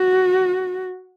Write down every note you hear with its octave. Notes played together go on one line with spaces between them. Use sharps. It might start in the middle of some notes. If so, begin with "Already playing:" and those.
Already playing: F#4